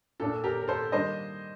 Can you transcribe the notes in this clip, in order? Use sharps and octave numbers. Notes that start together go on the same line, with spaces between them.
A#2 A3 D4 A4
G4 A#4
A#4
A4 C5
D#3 G3 A#3 D4 C5 D#5